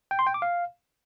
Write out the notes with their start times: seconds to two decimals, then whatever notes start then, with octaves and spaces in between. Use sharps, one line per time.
0.11 G5
0.19 C6
0.27 G5
0.34 D6
0.42 F5